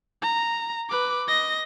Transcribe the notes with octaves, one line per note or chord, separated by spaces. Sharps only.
A#5
B4 D6
D#5 A#6